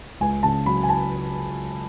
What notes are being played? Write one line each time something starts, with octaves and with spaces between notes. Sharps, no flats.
C#2 G#5
C#3 A5
F#3 B5
G#5
A5